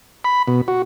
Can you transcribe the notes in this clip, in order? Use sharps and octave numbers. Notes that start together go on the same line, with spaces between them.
B5
B2
F#4